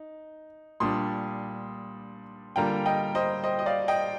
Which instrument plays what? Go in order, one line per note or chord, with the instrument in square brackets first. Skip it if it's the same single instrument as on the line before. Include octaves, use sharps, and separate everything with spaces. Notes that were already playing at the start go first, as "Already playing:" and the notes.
Already playing: [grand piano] D#4
[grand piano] A#2 G3 D4 [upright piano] C6 D#6
[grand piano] D3 G3 A#3 F4 [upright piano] G5 A#5
[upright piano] D#5 G5
C5 D#5
C5 D#5
D#5
D5 F5
D#5 G5